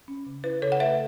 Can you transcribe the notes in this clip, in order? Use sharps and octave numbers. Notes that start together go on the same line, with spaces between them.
C#4
C#3
E4 B4
C#3 A4 C#5
F#5
A3 B4 E5